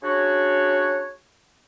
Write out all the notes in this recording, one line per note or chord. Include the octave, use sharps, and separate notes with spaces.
C#3 D4 F#4 C#5